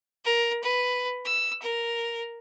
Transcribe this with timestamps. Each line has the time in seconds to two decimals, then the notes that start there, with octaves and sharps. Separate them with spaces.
0.25 A#4
0.63 B4
1.25 E6
1.62 A#4